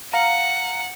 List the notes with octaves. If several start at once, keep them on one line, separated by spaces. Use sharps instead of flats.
F5 F#5 A#5